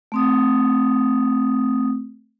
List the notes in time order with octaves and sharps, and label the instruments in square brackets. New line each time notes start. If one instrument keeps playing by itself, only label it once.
[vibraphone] A3 C4 D#6